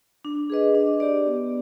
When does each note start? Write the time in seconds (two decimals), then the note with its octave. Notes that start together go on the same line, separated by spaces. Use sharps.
0.25 D4
0.50 G#4 B4 D#5
0.75 D4
1.00 G4 D5
1.26 B3